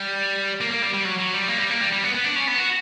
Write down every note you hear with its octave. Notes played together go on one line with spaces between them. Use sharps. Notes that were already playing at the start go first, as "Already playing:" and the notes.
Already playing: G3
A#3
A#3
G3
G3
F#3
F#3
G3
A#3
G3
A#3
G3
G3
B3
B3
D4
C#4
B3
F#4